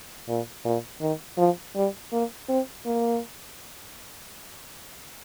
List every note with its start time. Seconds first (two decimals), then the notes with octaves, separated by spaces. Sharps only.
0.28 A#2
0.65 A#2
1.01 D#3
1.38 F3
1.75 G3
2.12 A#3
2.49 C4
2.86 A#3